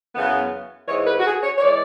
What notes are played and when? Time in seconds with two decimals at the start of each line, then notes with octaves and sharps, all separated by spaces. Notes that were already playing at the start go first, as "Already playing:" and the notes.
0.14 F#2 C#3 E3 B3
0.87 G#2 E3 G#3 C#5
1.07 B4
1.19 F#4
1.25 G#4
1.43 C#5
1.57 C#5
1.61 E3 G#3 D5